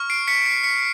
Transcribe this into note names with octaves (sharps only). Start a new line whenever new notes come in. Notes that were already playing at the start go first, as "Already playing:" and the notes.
Already playing: C#6 F6
C7 D7
B6 C#7
C7
B6 C#7